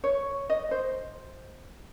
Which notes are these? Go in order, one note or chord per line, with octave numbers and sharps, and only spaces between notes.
C#5
D#5
C5